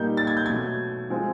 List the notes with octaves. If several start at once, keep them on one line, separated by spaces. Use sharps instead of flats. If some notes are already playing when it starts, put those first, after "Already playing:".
Already playing: A#2 G3 A#3 D#4 G6
A6
G#6
G6
B2 F#3 A3 G#6
F3 G#3 C4 F4